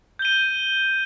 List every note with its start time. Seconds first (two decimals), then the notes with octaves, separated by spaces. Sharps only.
0.19 G6
0.22 G7
0.25 D#7